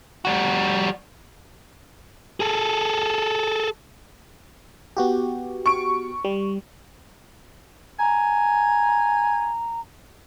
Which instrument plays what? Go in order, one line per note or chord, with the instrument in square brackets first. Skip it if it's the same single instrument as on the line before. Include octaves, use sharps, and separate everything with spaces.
[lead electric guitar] G3 F#4
G#4 A4
[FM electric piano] B3 F#4 G4
[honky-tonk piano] C#6 D7
[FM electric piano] G3
[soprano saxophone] G#5 [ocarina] A#5